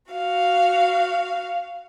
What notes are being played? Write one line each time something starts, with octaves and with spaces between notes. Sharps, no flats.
F#4 F5